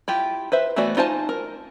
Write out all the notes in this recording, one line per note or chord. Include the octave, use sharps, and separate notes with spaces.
E4 F4 G4
B4 C5 E5
E3 A3 B3 F#4 D5
D#4 F4 C5 G#5 A5
A#4